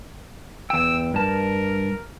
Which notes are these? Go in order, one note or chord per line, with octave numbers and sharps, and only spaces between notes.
E2 G5 E6
G2 A#4 A5